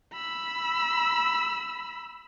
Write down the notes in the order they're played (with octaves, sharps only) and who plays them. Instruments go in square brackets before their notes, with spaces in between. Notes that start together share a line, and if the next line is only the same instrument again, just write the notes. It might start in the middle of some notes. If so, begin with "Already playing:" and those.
[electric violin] B5 E6